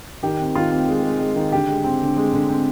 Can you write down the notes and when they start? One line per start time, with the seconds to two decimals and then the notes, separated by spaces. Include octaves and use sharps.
0.23 D#3 G4
0.40 C4
0.55 D#3 F4
0.71 C4
0.88 G#3
1.03 G#3
1.20 G#3
1.36 D#3
1.52 D3 G4
1.69 G#3
1.84 C4
2.01 D3
2.17 G#3
2.33 D3
2.49 C4